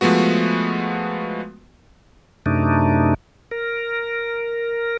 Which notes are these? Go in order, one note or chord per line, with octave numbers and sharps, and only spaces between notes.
F3 G#3 A3 B3 F#4
F#2 C3 A3 D4 D#4
A#4